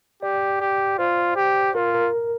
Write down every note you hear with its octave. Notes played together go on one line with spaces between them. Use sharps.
G4 D5
G4
F4 C5
G4
F4 A#4
A#4